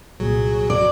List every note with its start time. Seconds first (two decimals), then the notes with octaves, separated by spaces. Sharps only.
0.20 C2 A#2 F#3 G#4
0.70 D5